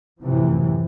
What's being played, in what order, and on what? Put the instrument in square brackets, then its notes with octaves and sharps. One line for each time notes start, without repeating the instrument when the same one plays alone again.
[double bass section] F#2 A2 C3 E3 F3